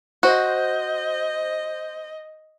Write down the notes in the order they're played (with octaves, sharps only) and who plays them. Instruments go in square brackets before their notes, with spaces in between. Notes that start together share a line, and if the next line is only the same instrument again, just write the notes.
[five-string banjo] F#4 [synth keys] C5 G6 [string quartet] D#5